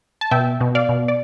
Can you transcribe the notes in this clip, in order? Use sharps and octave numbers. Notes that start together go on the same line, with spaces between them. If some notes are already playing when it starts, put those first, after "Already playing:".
A5
B2 E5 G5
B2
D5 F5
B2
D5